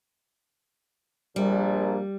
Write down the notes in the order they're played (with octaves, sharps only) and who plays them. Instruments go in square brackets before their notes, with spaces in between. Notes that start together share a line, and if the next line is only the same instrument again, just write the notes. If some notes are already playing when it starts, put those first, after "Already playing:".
[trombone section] A#1 A#3 D4 [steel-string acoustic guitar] G3